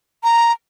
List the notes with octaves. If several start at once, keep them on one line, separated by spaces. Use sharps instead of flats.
A#5